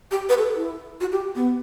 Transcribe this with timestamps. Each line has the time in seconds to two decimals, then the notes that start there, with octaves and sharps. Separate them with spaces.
0.11 G4
0.29 B4
0.38 A4
0.56 E4
1.01 F#4
1.12 G4
1.36 B3